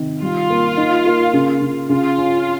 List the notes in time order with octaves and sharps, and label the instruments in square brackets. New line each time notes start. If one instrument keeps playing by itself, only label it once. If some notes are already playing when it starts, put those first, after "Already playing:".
Already playing: [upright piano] C3 D#3
[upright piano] G3 [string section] F4
[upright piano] A#3
D#4
A#3
C#3
C#3
[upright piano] C#3 [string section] F4
[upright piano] C#4